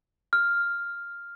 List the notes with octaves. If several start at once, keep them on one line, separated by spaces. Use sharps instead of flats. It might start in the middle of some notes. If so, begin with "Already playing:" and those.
F6